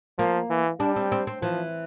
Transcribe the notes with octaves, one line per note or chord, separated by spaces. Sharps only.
F3 A#3
E3
G3 D4
C4
C4
C4
E3 F3